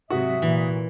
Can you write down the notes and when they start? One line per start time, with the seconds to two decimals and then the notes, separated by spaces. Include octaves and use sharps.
0.10 G#2 C3 F#3 F#4 E5 D#6
0.42 A#2 E3